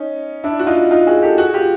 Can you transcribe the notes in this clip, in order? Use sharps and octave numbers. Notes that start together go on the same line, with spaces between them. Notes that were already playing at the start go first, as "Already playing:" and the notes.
Already playing: C#4 D#4
D4 E4
F#4
D#4 F4
D#4 F4
F#4 G#4
G4 A4
F#4 G#4
F4 G4